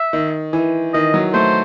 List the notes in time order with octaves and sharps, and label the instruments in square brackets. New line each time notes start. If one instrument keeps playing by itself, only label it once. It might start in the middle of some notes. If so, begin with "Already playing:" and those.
Already playing: [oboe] E5
[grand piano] D#3
E3
[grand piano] D#3 [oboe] D#5
[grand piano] F#3
[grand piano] A3 [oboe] C5